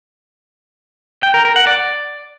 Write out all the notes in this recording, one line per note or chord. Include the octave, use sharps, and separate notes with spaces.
G5
A#4
A#4
F#5
D5